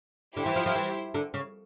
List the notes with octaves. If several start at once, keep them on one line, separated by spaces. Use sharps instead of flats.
D3 E4 G4 C5
E3
F3
F3
E3
D3
C#3